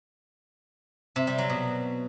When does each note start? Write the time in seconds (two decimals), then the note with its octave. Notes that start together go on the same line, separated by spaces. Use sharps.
1.16 C3
1.27 G3
1.38 F#3
1.50 B2